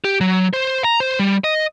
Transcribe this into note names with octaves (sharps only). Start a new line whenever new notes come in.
G4
F#3
C5
A#5
C5
G3
D#5